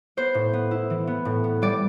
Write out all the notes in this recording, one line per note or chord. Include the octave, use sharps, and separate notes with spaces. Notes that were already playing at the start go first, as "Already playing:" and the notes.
B3 C5
A2
B3
E4
E3
B3
A2
B3
G3 D5